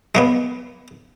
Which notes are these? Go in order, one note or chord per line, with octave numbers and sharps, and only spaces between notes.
G#3 A#3 B3